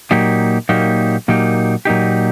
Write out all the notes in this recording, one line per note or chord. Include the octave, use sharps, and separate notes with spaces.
A#2 F#3 A#3 D#4 G4
A#2 F#3 A#3 D#4 G4
A#2 F#3 A#3 D#4 G4
A#2 F#3 A#3 D#4 G4